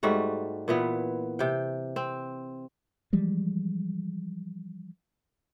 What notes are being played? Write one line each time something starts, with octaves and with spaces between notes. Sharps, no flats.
G#2 G3 A3 F#4
A#2 E3 B3
C3 G5
C4
E3 F3 G3 G#3